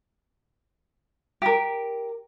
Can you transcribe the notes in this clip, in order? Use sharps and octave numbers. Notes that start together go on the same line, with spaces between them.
G4 A#4